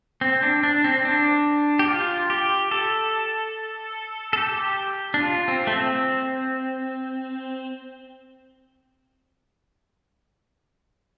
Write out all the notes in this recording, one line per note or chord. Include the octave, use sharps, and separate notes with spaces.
C4
D4
D4
C4
D4
G4
F4
G4
A4
A4
G4
D4
F4
C4
A3
C4